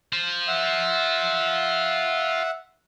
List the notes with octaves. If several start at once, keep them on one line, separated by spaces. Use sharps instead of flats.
F4 C5
E5 F#5